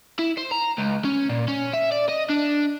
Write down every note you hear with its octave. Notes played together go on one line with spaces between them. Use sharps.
E4
C5
A#5
C#2
C#4
A#2
C#4
E5
D5
D#5
D4